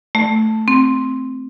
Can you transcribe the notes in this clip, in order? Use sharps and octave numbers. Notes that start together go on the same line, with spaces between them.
A3
C4